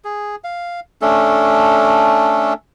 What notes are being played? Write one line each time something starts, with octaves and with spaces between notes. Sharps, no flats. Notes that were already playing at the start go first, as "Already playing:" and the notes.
G#4
F5
A3 C#4 D4 A4